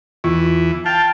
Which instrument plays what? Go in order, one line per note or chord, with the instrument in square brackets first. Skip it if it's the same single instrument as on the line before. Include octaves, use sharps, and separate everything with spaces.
[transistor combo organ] E2 E3 [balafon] F4
[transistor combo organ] F5 G5 [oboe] A5